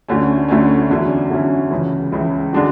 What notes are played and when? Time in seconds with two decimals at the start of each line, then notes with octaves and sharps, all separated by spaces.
0.08 D2 D3 A3 C#4
0.48 D2 D3 A3 C#4
0.90 E2 D3 F#3 C#4 E4
1.30 E2 D3 F#3 C#4 E4
1.71 C#2 C#3 E3
2.12 C#2 C#3 E3
2.53 D3 G#3 D4 F#4